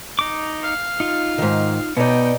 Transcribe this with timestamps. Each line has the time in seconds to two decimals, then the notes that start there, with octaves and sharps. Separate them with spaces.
0.19 D#4 D6
0.63 F5
1.00 D#4 F4
1.38 G#2 D#3
1.97 B2 B3 D#4 D5 G5